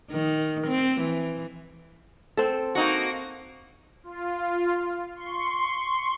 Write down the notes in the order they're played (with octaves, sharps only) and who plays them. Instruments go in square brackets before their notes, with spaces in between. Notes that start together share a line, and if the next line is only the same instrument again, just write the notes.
[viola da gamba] D#3
C4
E3
[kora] C4 A4
[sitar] A#3 D#4 F#4
[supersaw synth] F4
C6 C#6